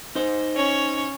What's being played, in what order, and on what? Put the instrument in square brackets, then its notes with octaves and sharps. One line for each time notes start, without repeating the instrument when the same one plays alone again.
[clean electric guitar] D#4 C5
[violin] C#4 C#5